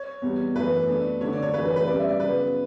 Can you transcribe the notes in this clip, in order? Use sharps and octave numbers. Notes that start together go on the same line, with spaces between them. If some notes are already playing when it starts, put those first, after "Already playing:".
Already playing: C#5
E2 B2 G3 B3
F#2 E3 A3 B4
B2 A3 D4
D3 A3 D4 C#5
D5
C#5
F#2 E3 A3 D4 B4
B4
B4
B2 G3 C#4 D5
E5
D5
C#3 F#3 B3 B4